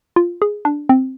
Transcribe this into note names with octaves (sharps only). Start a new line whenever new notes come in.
F4
G#4
D4
C4